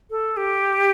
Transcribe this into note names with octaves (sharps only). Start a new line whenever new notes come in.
A4
G4